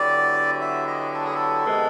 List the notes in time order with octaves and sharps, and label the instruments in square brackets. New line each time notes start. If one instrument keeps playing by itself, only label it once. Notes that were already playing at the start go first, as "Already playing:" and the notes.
Already playing: [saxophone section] D3 F#3 B3 E4 G4 [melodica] D5
[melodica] E5
D#5
A4
G#4
A4
[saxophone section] C3 D#3 G#3 B3